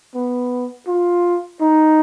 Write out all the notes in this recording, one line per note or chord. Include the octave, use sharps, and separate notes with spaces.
B3
F4
D#4